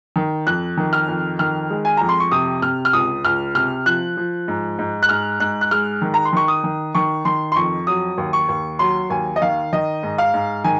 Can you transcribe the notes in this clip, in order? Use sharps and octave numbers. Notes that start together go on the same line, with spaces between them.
D#3
F2 F#6
D#3
F6
F2
D#3 F6
G#3
G#5
F2 A#5
C6
C#6
C3 D#6
C3 F6
F6
C#2 D#6
C#2 F6
C3 F6
F3 F#6
F3
G#2
G#2
F#6
G#2 F6
G#2 F#6
F#6
G#3 F6
D#3
A#5
C6
D#3 C#6
D#6
D#3
D#3 C#6
D#3 C6
C6
F2 C#6
F#3 D#6
D#2
C#6
D#2
F#3 C6
D#2 G#5
D#5
D#3 F5
D#3 D#5
G#2
F5
G#2
D#3 G#5